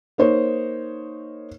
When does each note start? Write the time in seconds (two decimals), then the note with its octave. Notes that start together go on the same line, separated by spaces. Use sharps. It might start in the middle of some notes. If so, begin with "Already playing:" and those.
0.18 A#3 D#4 C5 C#5